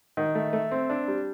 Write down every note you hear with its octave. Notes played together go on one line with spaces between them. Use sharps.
D#3
A3
A3
C4
D4
G3